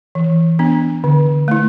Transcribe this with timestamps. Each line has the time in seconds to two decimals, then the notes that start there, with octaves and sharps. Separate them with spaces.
0.15 E3
0.59 B3 D4
1.04 D3
1.48 A3 E4